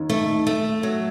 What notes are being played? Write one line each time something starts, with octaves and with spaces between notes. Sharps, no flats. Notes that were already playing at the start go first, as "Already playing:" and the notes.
Already playing: D#2
A3
A3
F#3